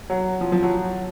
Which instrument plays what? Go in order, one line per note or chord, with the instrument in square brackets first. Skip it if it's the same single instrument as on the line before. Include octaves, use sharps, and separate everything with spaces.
[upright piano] F#3
F3
F3
F#3